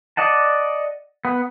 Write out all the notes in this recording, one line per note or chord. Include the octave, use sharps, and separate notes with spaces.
D5 D#5 F#5 A5
B3